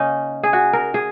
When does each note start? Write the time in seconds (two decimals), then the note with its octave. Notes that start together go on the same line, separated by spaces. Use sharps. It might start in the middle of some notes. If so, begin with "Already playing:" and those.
Already playing: C#3 A#3 C#4 D#4
0.43 G#4
0.53 F#4
0.73 A#4
0.94 G#4